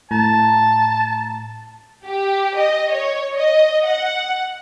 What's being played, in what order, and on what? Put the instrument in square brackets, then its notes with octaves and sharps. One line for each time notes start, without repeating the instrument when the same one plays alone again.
[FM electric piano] A2 A#5 [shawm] A5
[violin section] G4
D#5
C#5
D#5
F#5